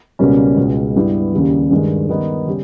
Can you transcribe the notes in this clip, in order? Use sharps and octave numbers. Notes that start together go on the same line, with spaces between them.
C#2 B2 G3 A#3 C#4
C#2 B2 G#3
G2 G3 B3 E4 G4
D#2 C#3 G3
G2 D#3 G#3
D#3 G3 B3 D#4 G4
C#3 G3 C#4 G4